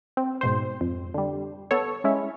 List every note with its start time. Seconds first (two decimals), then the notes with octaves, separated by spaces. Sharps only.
0.17 C4
0.41 G#2 B2 C5
0.81 F2
1.14 D3 G3
1.71 B3 A4 C#5
2.04 G#3 C#4 E4